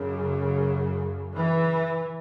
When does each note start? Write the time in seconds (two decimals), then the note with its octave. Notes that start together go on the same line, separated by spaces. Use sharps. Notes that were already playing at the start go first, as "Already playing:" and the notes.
Already playing: F#2 C#3
1.34 E3